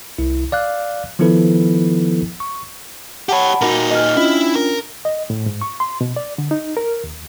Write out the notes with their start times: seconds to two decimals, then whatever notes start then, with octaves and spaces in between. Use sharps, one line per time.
0.18 C2 E4
0.52 D5 F5 F#6
1.19 D#3 F3 B3 E4 A4 B4
2.40 C#6
3.29 G4 C#5 F#5 A5 B5
3.61 A#2 D#4 F#4 A#4 A#5
3.91 D#5 F6
4.17 C#4 D4 E4 F4
4.56 A#4
5.05 D#5
5.30 A2
5.46 G#2
5.61 C#6
5.80 C6
6.01 B2
6.16 D5
6.38 D3
6.51 D#4
6.77 A#4
7.04 D#2